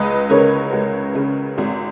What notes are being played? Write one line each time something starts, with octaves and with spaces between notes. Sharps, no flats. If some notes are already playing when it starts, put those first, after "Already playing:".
Already playing: C#2 B4 D#5
C#3 A#4 C#5
C#2
C#3
G#1